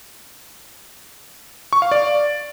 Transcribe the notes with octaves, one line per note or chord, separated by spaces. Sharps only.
C#6
F5
D5